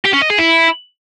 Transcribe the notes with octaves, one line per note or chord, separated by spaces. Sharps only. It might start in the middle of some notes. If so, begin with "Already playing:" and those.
G4
C#4
D#5
G#4
E4